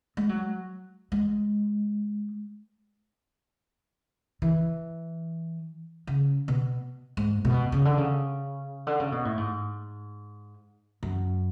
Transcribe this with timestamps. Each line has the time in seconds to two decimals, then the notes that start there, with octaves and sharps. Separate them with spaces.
0.17 G#3
0.29 F#3
1.12 G#3
4.42 E3
6.07 C#3
6.48 B2
7.17 G#2
7.45 B2
7.72 C#3
7.85 D3
7.98 C#3
8.87 D3
9.00 C#3
9.12 B2
9.25 A2
9.37 G#2
11.03 F#2